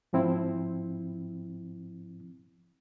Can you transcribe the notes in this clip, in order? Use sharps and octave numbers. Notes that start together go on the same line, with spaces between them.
G#2 F3 C4 E4